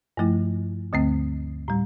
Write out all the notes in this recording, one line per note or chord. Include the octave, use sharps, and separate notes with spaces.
G2 F3 A3 E4
D2 D3 A3 C4
A2 G3